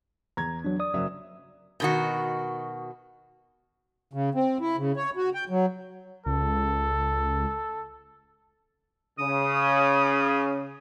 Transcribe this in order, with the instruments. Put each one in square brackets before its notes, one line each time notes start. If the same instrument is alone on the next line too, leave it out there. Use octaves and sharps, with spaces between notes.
[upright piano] E2 G#6 [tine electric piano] A#5
[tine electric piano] F#3 D4
D5 D#6
[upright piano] F#1 F#3 E5
[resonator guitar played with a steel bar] B2 D#3 F#4
[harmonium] C#3
C4
E4
C#3
C#5
F#4
G5
F#3
[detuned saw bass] C#2 [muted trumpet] A4
[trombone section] C#3 [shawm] D#6